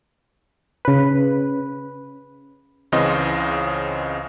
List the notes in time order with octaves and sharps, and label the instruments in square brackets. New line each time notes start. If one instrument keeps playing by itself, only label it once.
[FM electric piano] C#3 B4
[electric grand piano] C#2 C#3 E3 C4 D#5 C6